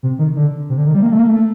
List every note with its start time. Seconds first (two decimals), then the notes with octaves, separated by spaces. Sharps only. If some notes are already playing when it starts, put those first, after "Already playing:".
0.03 C3
0.19 D#3
0.36 D3
0.69 C3
0.78 D3
0.86 D#3
0.94 G3
1.02 A#3
1.12 A3
1.19 A#3
1.28 A3